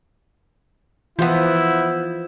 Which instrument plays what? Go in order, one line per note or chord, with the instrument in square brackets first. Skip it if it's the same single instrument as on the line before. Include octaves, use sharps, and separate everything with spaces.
[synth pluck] E3 F4 [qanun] F3 [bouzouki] B3 C5 [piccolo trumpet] E4